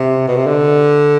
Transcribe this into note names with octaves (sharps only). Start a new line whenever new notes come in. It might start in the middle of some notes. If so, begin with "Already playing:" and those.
Already playing: C3
B2
C3
D3